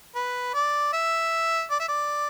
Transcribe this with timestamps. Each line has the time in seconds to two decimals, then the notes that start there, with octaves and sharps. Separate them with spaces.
0.15 B4
0.54 D5
0.93 E5
1.70 D5
1.80 E5
1.89 D5